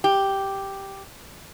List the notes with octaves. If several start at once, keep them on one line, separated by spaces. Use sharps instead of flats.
G4